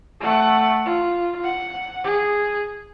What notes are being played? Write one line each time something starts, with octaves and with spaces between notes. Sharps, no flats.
A3 F#5
F4
F#5
G#4